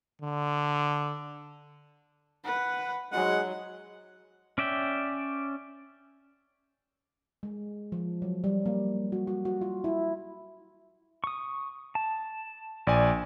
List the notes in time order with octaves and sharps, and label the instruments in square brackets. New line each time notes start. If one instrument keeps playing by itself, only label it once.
[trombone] D3
[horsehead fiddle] B4 F#5
[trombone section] G#2 G#3 [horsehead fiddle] F#3 [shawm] F#5
[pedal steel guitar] C#4 D5 E5 G5
[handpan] G#3
F3
F#3
G3
A#3
F#4
F#4
F#4
F4
E4
[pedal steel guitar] C#6 D#6
A5
[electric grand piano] A#1 D5 G#5